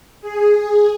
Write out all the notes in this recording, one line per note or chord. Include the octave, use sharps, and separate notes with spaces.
G#4